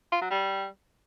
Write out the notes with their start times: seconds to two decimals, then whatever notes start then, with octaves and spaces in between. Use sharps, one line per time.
0.12 F4
0.21 F#3
0.30 G3